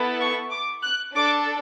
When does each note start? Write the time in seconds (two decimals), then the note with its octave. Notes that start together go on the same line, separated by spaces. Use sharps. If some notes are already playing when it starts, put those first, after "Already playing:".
Already playing: B3 E4 A4
0.20 C#6
0.52 D6
0.83 F#6
1.15 D4 A4 D6